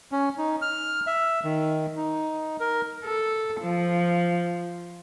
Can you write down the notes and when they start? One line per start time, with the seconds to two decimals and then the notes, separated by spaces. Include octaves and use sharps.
0.12 C#4
0.38 D#4
0.62 F6
1.07 E5
1.44 D#3
1.97 D#4
2.60 A#4
3.04 A4
3.61 F3